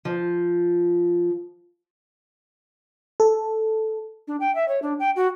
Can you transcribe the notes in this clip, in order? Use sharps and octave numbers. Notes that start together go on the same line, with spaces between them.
F3
A4
D4
G5
E5
C#5
D4
G5
F#4